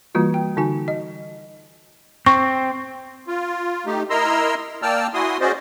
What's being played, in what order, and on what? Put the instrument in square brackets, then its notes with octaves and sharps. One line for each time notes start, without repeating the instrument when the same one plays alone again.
[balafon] E3 G3 A#3 F4 F#4
G5
D3 D#4 F#4 G#5
D#5
[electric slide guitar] C4 [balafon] C#6
[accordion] F4
A3 D#4 G4
E4 A#4 D#5 A#5 C6 E6
A#3 D5 G5 A5 E6 F6
E4 F#4 G#5 C6 D#6
C#4 F#4 G#4 C5 D5 D#5